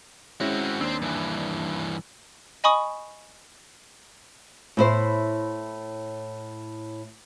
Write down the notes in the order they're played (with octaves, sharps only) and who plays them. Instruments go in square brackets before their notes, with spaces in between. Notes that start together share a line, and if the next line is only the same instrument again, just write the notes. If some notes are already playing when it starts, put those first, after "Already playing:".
[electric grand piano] G#3 C#4 E4 [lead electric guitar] C4 F#4
[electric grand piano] D#2 D4 [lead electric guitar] C4 C5
[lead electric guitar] G2 E3
[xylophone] D#5 G#5 B5 C#6 D#6
[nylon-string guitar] A2 E4 C5